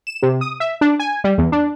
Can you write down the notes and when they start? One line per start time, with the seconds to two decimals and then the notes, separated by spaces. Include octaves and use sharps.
0.07 E7
0.22 C3
0.41 D#6
0.60 E5
0.81 D4
1.00 G#5
1.24 G3
1.38 E2
1.52 D4